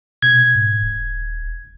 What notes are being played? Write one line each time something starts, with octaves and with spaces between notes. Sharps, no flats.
B2 G#6
G#2
D#1